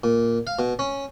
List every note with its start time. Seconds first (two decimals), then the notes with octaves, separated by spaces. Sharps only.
0.04 A#2
0.47 F5
0.59 B2
0.79 C#4